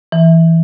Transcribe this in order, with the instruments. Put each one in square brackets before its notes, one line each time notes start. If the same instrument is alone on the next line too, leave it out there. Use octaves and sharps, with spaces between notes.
[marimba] E3